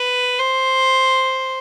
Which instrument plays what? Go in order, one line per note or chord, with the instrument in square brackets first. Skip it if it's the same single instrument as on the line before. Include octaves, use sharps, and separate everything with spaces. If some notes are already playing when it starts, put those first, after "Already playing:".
Already playing: [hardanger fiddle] B4
C5